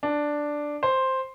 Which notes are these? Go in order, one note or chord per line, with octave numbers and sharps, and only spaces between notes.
D4
C5